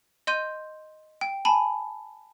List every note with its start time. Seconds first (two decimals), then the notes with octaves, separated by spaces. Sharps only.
0.27 D#5 C6 G6 D#7
1.21 G5
1.45 G#5 A5 B5